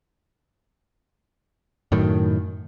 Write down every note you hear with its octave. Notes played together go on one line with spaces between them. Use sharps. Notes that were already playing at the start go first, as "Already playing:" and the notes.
F#2 A2 D#3